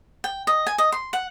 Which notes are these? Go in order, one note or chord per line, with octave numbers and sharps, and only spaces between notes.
G5
D#5
G#5
D#5
C6
F#5